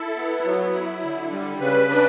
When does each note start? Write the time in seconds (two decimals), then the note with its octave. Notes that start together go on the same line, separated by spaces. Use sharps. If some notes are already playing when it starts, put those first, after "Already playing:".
Already playing: E4 A4
0.16 B3
0.45 F#3
0.74 E4
1.03 D3
1.32 G3
1.60 C#3 B4
1.90 D4